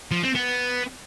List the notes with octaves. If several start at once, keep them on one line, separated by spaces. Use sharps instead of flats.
F3
C4
B3